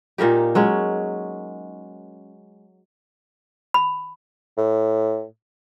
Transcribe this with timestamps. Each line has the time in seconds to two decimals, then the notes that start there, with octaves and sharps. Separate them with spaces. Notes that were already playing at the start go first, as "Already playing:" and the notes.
0.18 A#2 A#3 D#4 G4
0.55 F#3 G#3 C#4
3.74 B5
4.58 A2